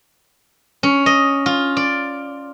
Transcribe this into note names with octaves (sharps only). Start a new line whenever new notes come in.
C#4
D#5
F4
D5